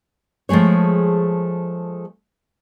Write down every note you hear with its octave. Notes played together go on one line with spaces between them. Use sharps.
F3 G#3 A3 G#4 C#5